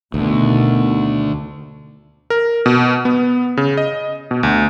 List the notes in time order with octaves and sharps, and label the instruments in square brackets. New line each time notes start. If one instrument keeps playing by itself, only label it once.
[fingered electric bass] D2 [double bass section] B2 D#3
[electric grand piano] A#4
B2
B3
C#3
D#5
B2
D2